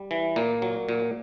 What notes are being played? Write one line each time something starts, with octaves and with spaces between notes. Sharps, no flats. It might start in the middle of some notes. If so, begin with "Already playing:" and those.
Already playing: G3
E3
A#2 A#3
F#3
A#2